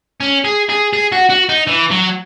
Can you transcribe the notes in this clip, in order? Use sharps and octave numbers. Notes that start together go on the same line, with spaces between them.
C#4
G#4
G#4
G#4
F#4
F#4
D#4
E3
F#3